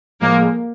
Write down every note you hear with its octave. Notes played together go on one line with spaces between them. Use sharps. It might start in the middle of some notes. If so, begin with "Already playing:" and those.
A2 F3 G#3 A#3